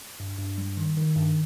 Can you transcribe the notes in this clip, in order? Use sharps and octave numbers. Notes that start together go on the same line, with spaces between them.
G2
G2
G3
D#3
D#3
G2